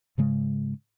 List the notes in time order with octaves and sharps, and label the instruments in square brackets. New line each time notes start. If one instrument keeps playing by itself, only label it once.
[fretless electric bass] G#2 C#3 G#3